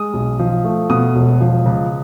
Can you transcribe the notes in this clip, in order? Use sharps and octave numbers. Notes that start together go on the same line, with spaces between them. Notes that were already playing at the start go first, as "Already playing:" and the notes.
Already playing: G#3 D#6
B1
F3
A3
B2 D#6
E1
F3
C#2